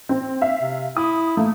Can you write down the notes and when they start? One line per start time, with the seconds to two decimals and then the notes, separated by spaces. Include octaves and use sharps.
0.09 C4
0.42 E5 F5
0.62 C3
0.97 E4 D#6
1.37 A3 A#3